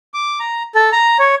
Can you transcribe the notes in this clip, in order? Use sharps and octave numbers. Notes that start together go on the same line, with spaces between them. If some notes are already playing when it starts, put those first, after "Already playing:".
D6
A#5
A4
A#5
C#5